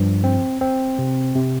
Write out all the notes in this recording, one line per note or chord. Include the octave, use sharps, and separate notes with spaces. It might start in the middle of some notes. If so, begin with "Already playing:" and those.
Already playing: G2 F3
C4
C4
C3
C3